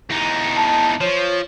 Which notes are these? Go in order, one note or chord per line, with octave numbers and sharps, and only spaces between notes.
E2 D#4
A5
F3 C#5